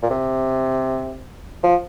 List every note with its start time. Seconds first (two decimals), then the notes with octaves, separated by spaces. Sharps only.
0.03 A#2
0.10 C3
1.63 F3